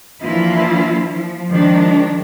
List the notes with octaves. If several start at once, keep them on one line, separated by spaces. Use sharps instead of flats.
E3 F3 A#3 D4 E4 F4
F3
D#3 F3 G#3 D4